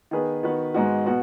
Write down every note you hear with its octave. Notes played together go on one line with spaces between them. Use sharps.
D#3 B3 G#4 B4
D#3 B3 F#4 B4
G#2 G#3 B3 D#4 F#4
B2 B3 F#4